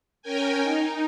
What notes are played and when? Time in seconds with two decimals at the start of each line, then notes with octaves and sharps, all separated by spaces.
0.22 C#4 A#4 G5 G#5
0.63 D#4